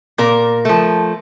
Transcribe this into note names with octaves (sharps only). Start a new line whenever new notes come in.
A#2 A#4
F3 A3